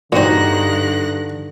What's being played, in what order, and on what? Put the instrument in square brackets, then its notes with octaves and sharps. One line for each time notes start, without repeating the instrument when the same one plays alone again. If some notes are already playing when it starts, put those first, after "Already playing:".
[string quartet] G2 F#6 A#6 [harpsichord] A#2 C4 [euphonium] D3 [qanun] D#4 F#4